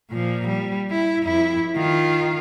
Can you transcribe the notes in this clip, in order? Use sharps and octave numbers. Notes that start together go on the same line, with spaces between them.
A#2 F3
G3
E4
F2 E4
D#3 F4